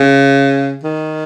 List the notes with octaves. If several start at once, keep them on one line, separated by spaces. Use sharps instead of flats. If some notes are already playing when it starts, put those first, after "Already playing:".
Already playing: C#3
D#3